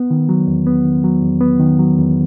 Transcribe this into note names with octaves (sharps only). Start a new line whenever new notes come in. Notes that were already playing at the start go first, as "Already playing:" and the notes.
Already playing: B3
D#3
F#3
E2
B3
D#3
F#3
E2
B3
D#3
F#3
E2